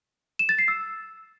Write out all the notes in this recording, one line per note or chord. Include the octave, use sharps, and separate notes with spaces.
E7
A6
C7
E6